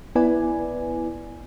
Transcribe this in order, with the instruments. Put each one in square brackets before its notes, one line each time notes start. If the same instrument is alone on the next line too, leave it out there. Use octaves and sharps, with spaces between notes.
[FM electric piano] B3 E4 B4 D5 G#5